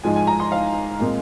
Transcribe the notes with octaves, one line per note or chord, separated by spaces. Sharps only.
G#2 F3 G#3 F4 G#5
G#5
A#5
C6
F5
A#2 G#3 C4